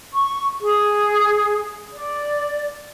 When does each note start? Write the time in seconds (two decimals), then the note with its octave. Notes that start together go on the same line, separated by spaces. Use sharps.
0.13 C#6
0.62 G#4
1.94 D5